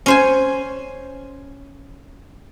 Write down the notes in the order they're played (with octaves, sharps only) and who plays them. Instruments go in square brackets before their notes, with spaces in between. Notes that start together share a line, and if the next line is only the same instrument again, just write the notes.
[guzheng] C#4 C5 G#5